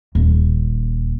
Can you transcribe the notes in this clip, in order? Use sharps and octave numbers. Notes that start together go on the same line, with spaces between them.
D#1